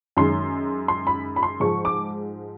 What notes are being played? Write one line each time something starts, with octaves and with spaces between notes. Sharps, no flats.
F#2 D#3 G#3 C6
C6
B5
B5
C6
G#2 F3 G#3 C#6
D6